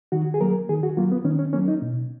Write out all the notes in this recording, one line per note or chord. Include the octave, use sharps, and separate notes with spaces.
D#3 F#4
G#4
F#3 A#3 A#4
D#3 G#4
F#4
F#3 A#3 F4
B3
D#3 C#4
C#4
F#3 A#3 C#4
D#4
B2